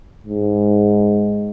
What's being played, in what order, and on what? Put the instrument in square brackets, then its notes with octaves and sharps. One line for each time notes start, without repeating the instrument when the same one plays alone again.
[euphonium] G#2